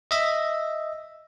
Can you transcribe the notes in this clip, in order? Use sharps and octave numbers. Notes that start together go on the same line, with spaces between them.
D#5 E5